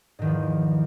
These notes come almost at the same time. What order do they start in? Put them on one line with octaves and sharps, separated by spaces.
G#2 D#3 E2 F3